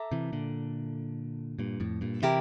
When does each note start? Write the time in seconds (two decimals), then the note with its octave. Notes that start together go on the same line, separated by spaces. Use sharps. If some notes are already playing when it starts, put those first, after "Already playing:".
Already playing: A4 E5 A#5 D6
0.12 C3 E3
0.32 A#2 D3
1.59 G2 A#2
1.80 F2 A2
2.01 G2 A#2
2.22 C3 E3 E4 G4 A#4